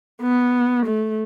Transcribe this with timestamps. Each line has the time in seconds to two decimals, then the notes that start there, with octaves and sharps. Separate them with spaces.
0.22 B3
0.86 A3